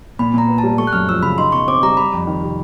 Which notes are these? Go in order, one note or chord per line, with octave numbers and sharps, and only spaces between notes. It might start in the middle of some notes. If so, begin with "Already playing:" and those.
A#2 B5
A#2 A#5
B3
A5
G3
A3 C#6
F#6
F#2 F6
F3 E6
C#3 B5
D#4 C6
B2 C#6
C4 D6
G3 A#5
G3 B5
F2
D#3
C3